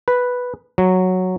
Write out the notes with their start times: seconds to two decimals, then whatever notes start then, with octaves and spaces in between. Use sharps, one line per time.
0.08 B4
0.78 F#3